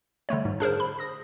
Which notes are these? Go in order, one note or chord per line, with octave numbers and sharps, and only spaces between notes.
D3 G3 A3 C#5
G#2
D4 G#4 A#4 C5
B5
D#6 A#6